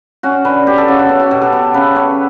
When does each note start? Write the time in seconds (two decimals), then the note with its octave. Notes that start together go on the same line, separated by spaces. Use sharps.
0.23 C#4 F#4
0.45 D3 B4
0.67 B3 G4
0.78 A4
0.88 C#3 F#4
0.99 F#4
1.09 B3
1.20 F#4
1.31 B2 G4
1.42 A4
1.52 B3 A4
1.74 C#3 B4
1.95 B3 C#5